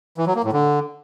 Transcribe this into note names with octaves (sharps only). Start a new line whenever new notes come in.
E3
F#3
A#3
A2
D3